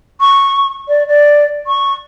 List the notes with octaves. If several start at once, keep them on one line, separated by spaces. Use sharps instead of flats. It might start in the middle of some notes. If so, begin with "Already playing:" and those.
C#6
D5
D5
C#6